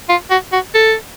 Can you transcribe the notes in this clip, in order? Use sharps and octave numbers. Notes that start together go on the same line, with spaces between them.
F4
F#4
F#4
A4